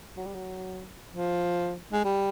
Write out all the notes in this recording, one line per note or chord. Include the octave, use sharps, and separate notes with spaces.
F#3
G3
F#3
F3
G#3
G3